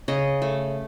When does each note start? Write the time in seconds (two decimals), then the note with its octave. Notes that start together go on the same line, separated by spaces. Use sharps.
0.08 C#3 D#5
0.42 A3